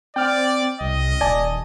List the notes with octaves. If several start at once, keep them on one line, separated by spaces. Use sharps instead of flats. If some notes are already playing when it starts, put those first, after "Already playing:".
C4 D5 G5 F6
C2 D#5
D#1 D5 G#5 A5